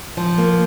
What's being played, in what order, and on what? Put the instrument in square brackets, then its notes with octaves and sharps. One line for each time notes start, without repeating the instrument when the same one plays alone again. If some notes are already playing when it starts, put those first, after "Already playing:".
[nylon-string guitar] F3
A#3